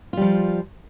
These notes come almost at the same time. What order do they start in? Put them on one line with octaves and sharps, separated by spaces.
F4 G3 F3